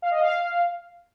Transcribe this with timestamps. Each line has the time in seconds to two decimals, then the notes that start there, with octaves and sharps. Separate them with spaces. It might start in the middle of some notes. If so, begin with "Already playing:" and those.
0.02 F5
0.11 D#5
0.20 F5